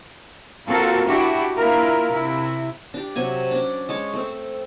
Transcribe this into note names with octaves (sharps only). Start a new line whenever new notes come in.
A#3 C4 F4 F#4 A4 A#4
D4 E4 F#4 G4
A#3 D4 E4 F4 A#4
C3 E4
D4 G4
C3 F#3 G#5 C#6
C#4 D4
G#3 C#5 A5
A3 C4